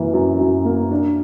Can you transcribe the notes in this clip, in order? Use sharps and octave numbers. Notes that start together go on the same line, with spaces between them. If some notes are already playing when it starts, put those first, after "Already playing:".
Already playing: F#2 E3 A#3
F#2
F#2
A#3
D4